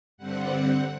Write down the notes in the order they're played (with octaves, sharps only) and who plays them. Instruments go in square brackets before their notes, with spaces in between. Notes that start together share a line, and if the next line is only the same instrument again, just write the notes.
[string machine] G2 D3 G3 C4 F#5